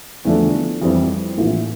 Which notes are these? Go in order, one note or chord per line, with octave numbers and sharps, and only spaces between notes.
E2 D3 F3 A3 D4
F2 E3 G3 C4
A#1 A2 E3